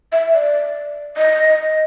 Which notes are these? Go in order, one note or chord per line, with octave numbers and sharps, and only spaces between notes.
E5
D5
D#5